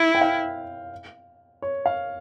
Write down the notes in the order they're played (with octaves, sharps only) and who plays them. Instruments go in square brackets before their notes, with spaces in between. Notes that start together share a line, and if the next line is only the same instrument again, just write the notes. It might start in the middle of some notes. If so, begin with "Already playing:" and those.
Already playing: [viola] E4
[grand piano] G5
F5
C#5
F5